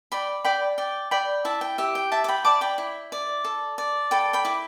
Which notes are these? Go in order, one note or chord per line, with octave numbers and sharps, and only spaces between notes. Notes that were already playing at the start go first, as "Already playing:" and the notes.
D5 G5 B5
D5 G5 B5
D5 G5
D5 G5 B5
E4 E5 A5
G5
G4 E5
G5
E4 E5 A5
D6
G5 B5
D5 A5 D6
G5 B5
E4
D5
A4
D5
A4 G5 B5
G5 B5
E4 D6